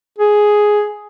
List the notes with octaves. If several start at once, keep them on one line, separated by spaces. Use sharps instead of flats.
G#4